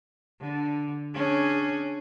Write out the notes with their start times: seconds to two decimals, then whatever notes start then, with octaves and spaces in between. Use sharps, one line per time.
0.41 D3
1.14 C#4 D4 G#4